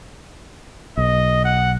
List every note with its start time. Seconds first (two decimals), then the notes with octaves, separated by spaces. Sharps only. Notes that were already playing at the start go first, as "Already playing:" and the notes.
0.97 B1 D#5
1.45 F#5